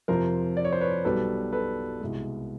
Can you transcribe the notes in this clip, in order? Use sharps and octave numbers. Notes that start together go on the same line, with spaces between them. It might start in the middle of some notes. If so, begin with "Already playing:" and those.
F2 C3 F3 A#4 C5
D5
C#5
C5
B4 C#5
B1 B2 G3 A4 B4
A4 B4
C2 B2 G#3